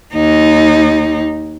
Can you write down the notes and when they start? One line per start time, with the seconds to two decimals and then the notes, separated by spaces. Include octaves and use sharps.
0.14 D#2 D#4